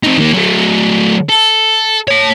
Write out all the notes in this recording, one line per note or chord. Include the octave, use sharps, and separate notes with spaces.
C4 D#4
D#3 A#3
F#3 A3
A4
C#5 A5